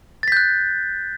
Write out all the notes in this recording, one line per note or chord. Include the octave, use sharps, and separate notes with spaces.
F#6 G6 A6 B6